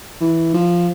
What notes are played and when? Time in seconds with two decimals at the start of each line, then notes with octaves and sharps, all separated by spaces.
0.21 E3
0.54 F3